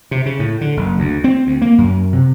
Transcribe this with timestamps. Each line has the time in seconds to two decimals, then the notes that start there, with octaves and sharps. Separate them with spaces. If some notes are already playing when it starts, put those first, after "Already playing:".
0.11 C3
0.26 C#3
0.39 A2
0.61 D3
0.77 F#1
0.99 D2
1.24 C4
1.47 D2
1.62 A#3
1.78 F#2
2.13 C3